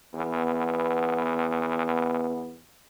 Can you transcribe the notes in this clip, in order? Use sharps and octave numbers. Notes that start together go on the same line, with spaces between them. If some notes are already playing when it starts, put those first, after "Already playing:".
E2 B3